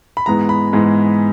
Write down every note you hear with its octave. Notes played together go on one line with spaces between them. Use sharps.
B5
G#2 E3 G#3 B3 A#5
B5
G#2 E3 G#3 B3